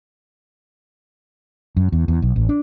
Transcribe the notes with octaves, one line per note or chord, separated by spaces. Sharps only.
F#2
E2
E2
B1
A1
D4